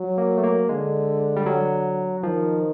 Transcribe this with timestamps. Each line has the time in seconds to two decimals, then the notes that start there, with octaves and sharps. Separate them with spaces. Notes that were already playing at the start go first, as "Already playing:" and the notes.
Already playing: F#3
0.18 A#3
0.38 A3
0.44 A#3
0.69 D3 G#3
1.36 G3
1.46 F#3
2.23 D#3 F3